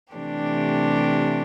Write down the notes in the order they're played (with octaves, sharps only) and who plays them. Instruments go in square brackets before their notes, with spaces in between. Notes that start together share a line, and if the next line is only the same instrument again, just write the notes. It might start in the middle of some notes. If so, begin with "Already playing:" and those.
[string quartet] C3 E3 A3 D4 G4